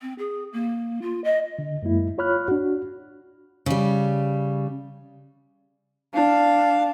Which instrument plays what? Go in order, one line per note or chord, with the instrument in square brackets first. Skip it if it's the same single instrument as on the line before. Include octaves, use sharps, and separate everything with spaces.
[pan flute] C4
G#4
A#3
F4
D#5
[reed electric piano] D3
F#2 G#3 A#3 E4
F4 C#5 B5 F6 F#6
D4 F#4
[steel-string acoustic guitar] C#3 G3
[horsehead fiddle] D4 [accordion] F5